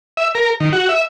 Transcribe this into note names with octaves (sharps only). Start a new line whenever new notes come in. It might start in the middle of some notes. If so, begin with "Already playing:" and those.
E5
A#4
D#3
F#4
E5